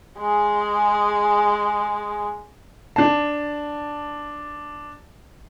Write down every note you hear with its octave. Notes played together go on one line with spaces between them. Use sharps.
G#3 G#4
D4 A5